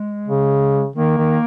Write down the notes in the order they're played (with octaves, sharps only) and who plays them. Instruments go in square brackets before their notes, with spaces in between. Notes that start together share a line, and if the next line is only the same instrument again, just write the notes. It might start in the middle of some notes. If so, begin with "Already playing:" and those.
Already playing: [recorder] G#3
[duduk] C#3
[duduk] D#3 [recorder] A#3
[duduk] D#3